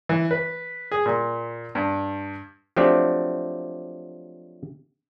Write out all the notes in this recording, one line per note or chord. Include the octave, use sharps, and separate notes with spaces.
E3
B4
G#4
A#2
G2
F3 F#3 A3 C4 D4 G4